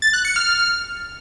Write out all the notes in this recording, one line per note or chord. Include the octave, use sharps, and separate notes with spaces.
A6
F#6
C#7
F6